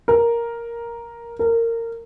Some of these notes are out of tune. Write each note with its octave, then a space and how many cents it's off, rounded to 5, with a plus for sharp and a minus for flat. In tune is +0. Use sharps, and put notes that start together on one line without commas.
A#4 +5
A#4 -20